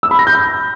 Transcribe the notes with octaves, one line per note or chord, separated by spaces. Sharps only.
E6
B5
A#6
G6
B5